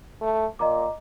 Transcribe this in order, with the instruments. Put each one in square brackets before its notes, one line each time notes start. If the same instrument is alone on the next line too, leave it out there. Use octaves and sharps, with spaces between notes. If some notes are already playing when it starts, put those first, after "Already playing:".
[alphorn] A3
[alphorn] A#2 [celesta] D#5 A#5 D6